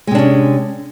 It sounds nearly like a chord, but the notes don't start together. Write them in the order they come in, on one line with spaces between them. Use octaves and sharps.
G#3 C3 D4 C#4